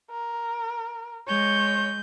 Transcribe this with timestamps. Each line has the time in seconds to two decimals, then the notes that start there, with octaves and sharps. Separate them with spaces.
0.11 A#4
1.28 G#3 C#5 G6